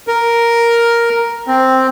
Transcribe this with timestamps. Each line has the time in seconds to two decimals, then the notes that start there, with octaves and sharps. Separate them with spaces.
0.08 A#4
1.48 C4